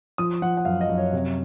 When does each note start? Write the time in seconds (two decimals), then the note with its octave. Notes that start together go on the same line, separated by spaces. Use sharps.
0.18 F3 D#6
0.42 F3 F#5
0.57 F#5
0.65 F#2 F5
0.81 D#5
0.89 F#2
0.98 C#5
1.13 C3 C#5